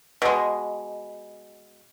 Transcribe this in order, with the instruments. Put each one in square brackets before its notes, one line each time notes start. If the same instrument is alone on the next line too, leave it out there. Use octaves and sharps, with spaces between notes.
[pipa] B2 G#3